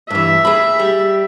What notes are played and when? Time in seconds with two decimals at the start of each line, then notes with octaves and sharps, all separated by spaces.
0.10 G2 E3 E5
0.45 G#4 B5
0.80 G3